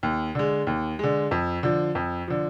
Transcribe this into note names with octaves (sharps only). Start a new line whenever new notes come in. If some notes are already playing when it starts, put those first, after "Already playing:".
D#2
D3 G#3
D#2
D3 G#3
F2
D3 F3
F2
D3 F3